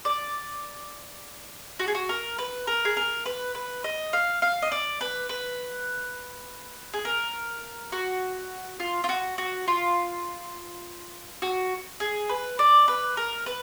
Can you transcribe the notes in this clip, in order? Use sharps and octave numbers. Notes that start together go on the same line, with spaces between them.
D5
F#4
G#4
F#4
A#4
B4
A#4
G#4
A#4
B4
B4
D#5
F5
F5
D#5
D5
B4
B4
G#4
A#4
F#4
F4
F4
F#4
F#4
F4
F#4
G#4
B4
D5
B4
A#4
B4